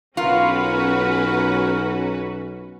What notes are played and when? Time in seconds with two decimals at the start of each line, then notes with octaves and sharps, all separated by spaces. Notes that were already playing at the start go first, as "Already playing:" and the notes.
0.17 B1 C#4 F4 F#4 A#4 B4